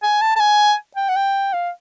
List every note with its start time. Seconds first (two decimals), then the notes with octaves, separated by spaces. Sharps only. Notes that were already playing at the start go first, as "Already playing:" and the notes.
0.03 G#5
0.21 A5
0.36 A5
0.40 G#5
0.96 G5
1.09 F#5
1.16 G5
1.53 F5